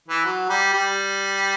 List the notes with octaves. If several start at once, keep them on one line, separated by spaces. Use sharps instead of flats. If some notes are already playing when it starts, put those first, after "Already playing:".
E3
F#3
G3
G3